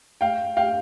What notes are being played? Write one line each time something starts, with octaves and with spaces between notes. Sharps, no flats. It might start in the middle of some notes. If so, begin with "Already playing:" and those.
F5 G5
F5 G5